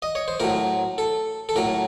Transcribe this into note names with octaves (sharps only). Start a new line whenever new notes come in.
D#5
C#5
C5
A2 F#3 A#4
A4
A4
A2 F#3 A#4